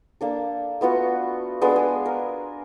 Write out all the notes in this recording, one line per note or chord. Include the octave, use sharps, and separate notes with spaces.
A#3 D4 A4
A3 B3 F4 F#4
G#3 B3 D4 A4
G#4
A#4